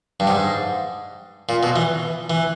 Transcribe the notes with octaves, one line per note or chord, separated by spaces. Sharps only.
G2
G#2
A#2
B2
E3
E3